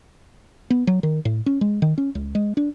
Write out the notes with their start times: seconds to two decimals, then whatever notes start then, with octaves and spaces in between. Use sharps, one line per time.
0.70 B3
0.87 F#3
1.03 D#3
1.25 A2
1.46 C#4
1.61 G#3
1.82 D#3
1.98 C#4
2.15 C#2
2.35 G#3
2.57 D4